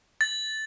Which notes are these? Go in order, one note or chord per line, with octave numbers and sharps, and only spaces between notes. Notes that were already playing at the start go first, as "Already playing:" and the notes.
A6